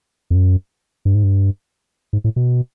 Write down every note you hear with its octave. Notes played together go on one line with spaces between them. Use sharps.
F2
F#2
G2
G#2
G2
G#2
A2
B2